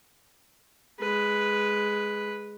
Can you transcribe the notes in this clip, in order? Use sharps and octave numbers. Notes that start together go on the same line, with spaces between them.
G#3 B4